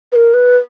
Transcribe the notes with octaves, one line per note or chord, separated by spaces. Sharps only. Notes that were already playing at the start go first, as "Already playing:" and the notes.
B4
A#4
B4